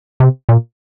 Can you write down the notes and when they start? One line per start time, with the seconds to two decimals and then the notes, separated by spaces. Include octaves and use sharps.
0.20 C3
0.49 A#2